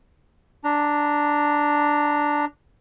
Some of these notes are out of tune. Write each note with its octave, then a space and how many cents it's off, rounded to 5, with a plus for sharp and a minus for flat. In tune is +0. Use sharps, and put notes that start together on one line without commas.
D4 +0 A#5 -15